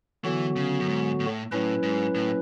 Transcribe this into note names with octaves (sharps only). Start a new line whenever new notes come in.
D3 E3 F#3 B3 F#4
C#3
F#2
G#2
A2
A2 F#3 C#4 E4 B4
G#2
A2